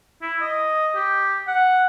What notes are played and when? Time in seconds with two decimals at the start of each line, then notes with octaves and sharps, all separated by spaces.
0.22 E4
0.41 D#5
0.95 G4
1.48 F#5